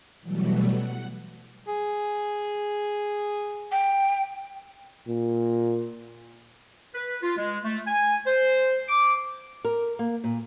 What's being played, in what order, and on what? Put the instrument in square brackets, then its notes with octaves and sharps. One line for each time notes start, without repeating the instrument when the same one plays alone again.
[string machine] B2 E3 F#3 G3 A3
F#5
[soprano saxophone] G#4
[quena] G5
[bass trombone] A#2
[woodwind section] B4
F4
G#3
A3
G#5
C5
D6
[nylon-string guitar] A#4
A#3
A#2